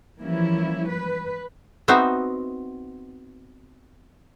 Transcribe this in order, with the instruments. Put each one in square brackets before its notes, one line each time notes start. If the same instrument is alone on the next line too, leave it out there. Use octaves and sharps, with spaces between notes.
[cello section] E3 F3 G3 A#3 C#4 E4
B4
[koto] B3 C4 D#4 F#4 C5 E5